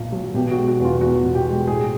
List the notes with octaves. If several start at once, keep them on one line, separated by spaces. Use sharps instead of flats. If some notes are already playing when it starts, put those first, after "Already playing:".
Already playing: B1 A#2
F#3
B2 G4
G#3 F#4
F#4
E2
F4
E2 F#4
B2
G4
G#3
A2 G#4